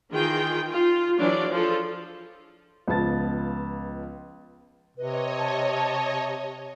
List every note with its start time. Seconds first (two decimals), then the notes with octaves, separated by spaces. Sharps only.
0.13 D#3 E3 F4 G#4 G5
0.71 F4
1.20 E3 F#3 D4 G#4 D5 F5
1.50 F3 F4 G#4 A4
2.88 C#2 F3 B3 A5 A6
4.97 C3 B4 C#5 D#5
5.38 A5